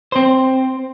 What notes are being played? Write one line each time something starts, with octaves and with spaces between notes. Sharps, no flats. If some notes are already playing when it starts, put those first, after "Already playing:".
C4 C5